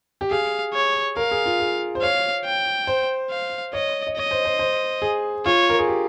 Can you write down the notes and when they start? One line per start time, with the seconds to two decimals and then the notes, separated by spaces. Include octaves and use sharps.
0.21 G4
0.31 G#4 F5
0.74 C#5
1.17 A#4 F5
1.31 G#4
1.46 F4
1.60 G#4
1.95 C5
2.02 C#5 F5
2.45 G5
2.87 C5
3.31 F5
3.73 C#5 D#5
4.07 D#5
4.17 C#5 D#5
4.31 C5
4.45 C5
4.59 C5
5.02 G#4
5.46 F4 C#5
5.70 A#4
5.79 G#4
5.88 G4